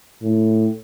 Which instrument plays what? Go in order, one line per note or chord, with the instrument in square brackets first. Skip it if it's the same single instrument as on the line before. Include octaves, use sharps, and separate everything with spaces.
[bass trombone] A2